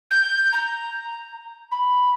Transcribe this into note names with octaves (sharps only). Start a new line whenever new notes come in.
G6
A#5
B5